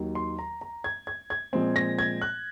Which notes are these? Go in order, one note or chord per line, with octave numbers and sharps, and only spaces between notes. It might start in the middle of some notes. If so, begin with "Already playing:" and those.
Already playing: D#2 D#3 F#3
C6
A#5
A#5
G#6
G#6
G#6
A#2 F3 G#3 C4
A#6
G#6
F#6